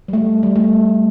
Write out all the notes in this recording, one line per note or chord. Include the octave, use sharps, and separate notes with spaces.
G3
A3
G3
A3